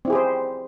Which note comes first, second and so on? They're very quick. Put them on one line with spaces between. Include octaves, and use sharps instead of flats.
C4 E4 G#4 G4 C5